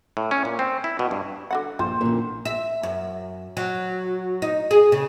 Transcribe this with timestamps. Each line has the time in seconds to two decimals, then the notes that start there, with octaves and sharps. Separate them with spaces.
0.17 A2
0.31 C#4
0.45 A#2
0.59 C4
0.84 E4
0.99 B2
1.11 G2
1.51 D3 F#4 F#5
1.79 A#1 G3 C5
2.01 A1 A#2 D3
2.45 E5
2.83 F#2
3.57 F#3
4.42 D#4
4.71 G#4
4.92 C#3